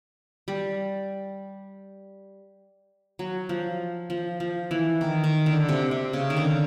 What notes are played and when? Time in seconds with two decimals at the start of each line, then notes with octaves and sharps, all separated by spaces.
0.48 G3
3.19 F#3
3.49 F3
4.10 F3
4.40 F3
4.71 E3
5.01 D#3
5.24 D#3
5.46 D3
5.69 C3
5.91 C3
6.13 C#3
6.30 D#3
6.37 D3